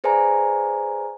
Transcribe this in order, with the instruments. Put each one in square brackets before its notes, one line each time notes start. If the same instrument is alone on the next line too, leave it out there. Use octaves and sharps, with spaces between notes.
[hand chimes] G#4 B4 C5 D5 G#5 A#5